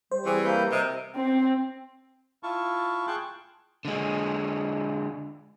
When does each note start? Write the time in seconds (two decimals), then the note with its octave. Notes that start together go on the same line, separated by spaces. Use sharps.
0.12 G3 C5
0.26 E3 C4 G#4 C#6
0.45 A#3 B4 G6
0.72 C3 G4 A#4 D#5
1.16 C4
2.43 E4 F4 A5 C#6
3.07 G#4 G5 A5 C6 C#6 F#6
3.85 D3 G#3